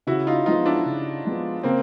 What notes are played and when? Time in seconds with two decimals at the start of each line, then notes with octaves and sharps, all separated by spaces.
0.07 C#3 E4 F#4
0.27 D#4 F4
0.46 F3 G#3 B3 D#4 F4
0.65 D4 E4
0.85 C#3
1.25 F3 G#3 B3
1.63 C#3 A#3 C4